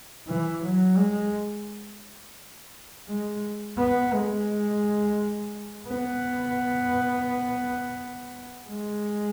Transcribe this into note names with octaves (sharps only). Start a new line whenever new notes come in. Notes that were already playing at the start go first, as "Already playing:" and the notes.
E3
F#3
G#3
G#3
B3
G#3
B3
G#3